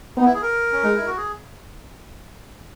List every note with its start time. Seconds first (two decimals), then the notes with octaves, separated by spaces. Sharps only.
0.17 B3 D#4
0.25 E4
0.34 G#4
0.42 A#4
0.72 C#4
0.83 G#3 D#4
0.95 E4
1.06 F#4
1.17 G#4